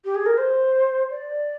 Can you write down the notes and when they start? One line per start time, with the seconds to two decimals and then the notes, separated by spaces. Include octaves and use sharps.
0.05 G4
0.15 G#4
0.26 A#4
0.38 C5
1.10 D5